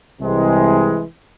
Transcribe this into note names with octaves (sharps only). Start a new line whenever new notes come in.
C2 C3 E3 G#3